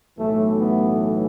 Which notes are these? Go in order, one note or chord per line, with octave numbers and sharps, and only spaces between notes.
B1 A2 E3 A3
B3